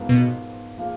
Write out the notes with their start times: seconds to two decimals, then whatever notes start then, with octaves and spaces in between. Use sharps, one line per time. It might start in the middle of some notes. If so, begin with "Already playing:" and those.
Already playing: G#2 F3 B3 F4 A#4
0.09 B2
0.78 F3 A#3 F4 G#4